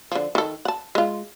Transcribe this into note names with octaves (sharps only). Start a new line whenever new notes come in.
D3 F3
D#3 A4
F#5 A5
G#3 F4